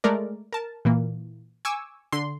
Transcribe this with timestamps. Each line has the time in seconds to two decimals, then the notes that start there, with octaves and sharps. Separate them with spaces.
0.04 G#3 A3 A#4 D5
0.53 A#4 A5
0.85 A#2 E3 A#3
1.65 G#5 C#6 D6 E6
2.12 D3 C6